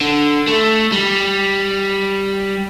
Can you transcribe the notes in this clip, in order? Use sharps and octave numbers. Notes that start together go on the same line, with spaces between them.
D3
A3
G3